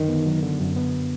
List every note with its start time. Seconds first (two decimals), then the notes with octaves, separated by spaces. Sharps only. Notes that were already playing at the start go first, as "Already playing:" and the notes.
Already playing: F#2 D3 D#3
0.08 B3
0.26 F#3
0.43 D3
0.60 F#2
0.76 B3